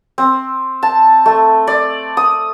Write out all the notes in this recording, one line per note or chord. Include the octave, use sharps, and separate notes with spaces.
C4
A5
A3
D5
D#6